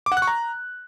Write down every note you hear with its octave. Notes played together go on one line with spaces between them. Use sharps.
D6
F#5
F#6
C#6
A#5